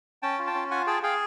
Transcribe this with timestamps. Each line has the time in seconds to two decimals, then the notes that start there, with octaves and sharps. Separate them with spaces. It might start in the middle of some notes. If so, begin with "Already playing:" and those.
0.23 C#4 G5 A5
0.39 F4
0.47 G5 A5
0.55 C#4
0.71 F4 F#5 G#5
0.87 G#4 G5 A5
1.03 G#4 F5 G5